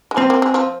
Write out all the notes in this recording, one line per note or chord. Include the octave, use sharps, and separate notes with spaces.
G#3
F3 C4
A#3
G#3
F3